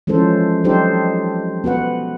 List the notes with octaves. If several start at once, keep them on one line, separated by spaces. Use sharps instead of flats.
E3 F3 G#3 C#4 A4 C5
F#3 D4 D#4 G4 A4 C5
B3 F#4 B4 F#5